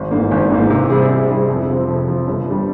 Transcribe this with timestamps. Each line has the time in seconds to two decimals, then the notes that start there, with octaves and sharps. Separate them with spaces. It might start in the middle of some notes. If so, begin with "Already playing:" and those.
Already playing: G#1
0.11 G#2 E3 A#3
0.31 G#1
0.50 G#2 E3 A#3
0.70 C3
0.90 G3 C4 E4 G#4
1.09 C3
1.29 G3 C4 E4 G#4
1.49 F2
1.69 C3 F3 C4
1.88 F2
2.08 C3 F3 C4
2.27 G1
2.46 G2 G3